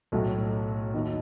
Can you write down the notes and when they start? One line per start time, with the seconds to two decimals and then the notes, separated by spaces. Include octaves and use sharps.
0.12 B1 A2 F#3 A3
0.93 D#2 D#3 A3 D#4 F#4